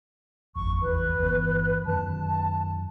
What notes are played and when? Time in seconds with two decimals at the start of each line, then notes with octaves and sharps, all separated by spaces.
0.56 G#1 F2 C#6
0.82 G#1 E2 E3 B4
1.18 G1 E3 B3
1.85 F#2 D#3 F#3 A5